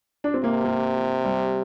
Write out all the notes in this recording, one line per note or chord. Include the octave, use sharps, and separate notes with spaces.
D4
C4
C3 A#3
A#3
G3